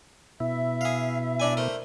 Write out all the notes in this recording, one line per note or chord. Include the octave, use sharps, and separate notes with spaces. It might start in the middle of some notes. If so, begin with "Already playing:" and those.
B2 E4 E5
G#4 F5
D4 D5 G#5
A3 A#4 C5